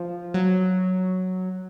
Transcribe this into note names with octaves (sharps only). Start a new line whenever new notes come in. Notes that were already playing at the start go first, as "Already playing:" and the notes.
Already playing: F3
F#3